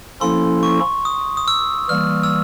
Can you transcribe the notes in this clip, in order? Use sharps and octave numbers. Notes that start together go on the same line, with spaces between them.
F3 A#3 C#4 E4 A4 C6
C#6
D#6
D#6
E6
E3 G3 A#3 F6
E6